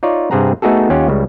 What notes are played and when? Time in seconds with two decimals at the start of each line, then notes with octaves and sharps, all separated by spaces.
0.03 D#4 F4 C#5 D5
0.31 G2 C3 C4 G#4 F#5 A#5
0.62 A3 B3 D#4 F#4 G#4 A4
0.90 D#2 C#4 F4 G4 C#5 F#5
1.08 C#2 C#3 G3